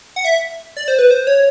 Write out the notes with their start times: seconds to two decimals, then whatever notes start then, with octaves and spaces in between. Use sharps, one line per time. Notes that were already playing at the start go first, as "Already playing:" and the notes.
0.16 F#5
0.25 E5
0.77 D5
0.88 C5
0.99 B4
1.11 C5
1.27 C#5